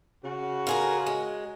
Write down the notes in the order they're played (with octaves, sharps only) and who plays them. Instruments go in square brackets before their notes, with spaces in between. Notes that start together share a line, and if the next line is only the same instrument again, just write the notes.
[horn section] C#3 F#4
[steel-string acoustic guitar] F4 G#4 A#4
G#3